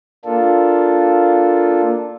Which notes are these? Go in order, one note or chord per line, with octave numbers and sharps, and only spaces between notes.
A#3 D4 F4 A4